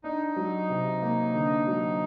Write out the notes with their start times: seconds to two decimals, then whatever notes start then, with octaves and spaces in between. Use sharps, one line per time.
0.04 D4 D#4
0.36 F#3
0.70 C3
1.02 A#3
1.35 D3
1.67 F#3